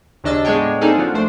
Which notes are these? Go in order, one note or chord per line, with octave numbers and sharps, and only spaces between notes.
D#2 C#3 D4 D#5 E6 A6
A2 G#3 B3 D4 C#5 G5
A#3 C4 D4 D#4 G#4 A4
F3 D4 F#4
A1 A3 D4 C5 D5